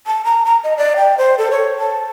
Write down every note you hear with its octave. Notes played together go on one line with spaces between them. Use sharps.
A5
A#5
A#5
D#5
D5
G5
C5
A4
C#5
A5